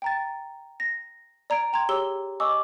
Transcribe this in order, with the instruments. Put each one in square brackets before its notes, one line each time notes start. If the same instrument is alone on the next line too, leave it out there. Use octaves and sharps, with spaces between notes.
[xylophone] G5 A#5 A6
A#6
D5 A#5 G#6 D7
G5 A#5 C6 G#6
G4 G#4 C#5 E6 G7
D#5 G#5 C#6 D6 E6